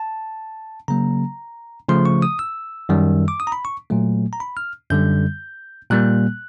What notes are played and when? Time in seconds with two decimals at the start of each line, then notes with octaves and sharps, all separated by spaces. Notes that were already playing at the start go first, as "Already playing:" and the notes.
Already playing: A5
0.88 C#3 F#3 A#3 A#5
1.89 C#3 F3 A3 C6
2.06 C#6
2.22 D#6
2.39 E6
2.89 F#2 D#3 G3
3.28 D6
3.40 D#6
3.47 A#5
3.52 B5
3.65 C#6
3.90 A#2 F#3 A3
4.33 A#5
4.40 B5
4.57 F6
4.90 F#2 D3 G3 G6
5.90 A#2 G3 A#3 F#6